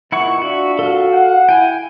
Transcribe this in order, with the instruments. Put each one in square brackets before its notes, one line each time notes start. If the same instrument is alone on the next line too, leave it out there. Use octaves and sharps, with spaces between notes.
[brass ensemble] E2 A#2 D#3 [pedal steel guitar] E4 F#5 C#6
[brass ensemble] D4 F4 E5 [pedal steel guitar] F#4
[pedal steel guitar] F#4 A4 [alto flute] F5
[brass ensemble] F#5
[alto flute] E4 [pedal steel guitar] G5 G#5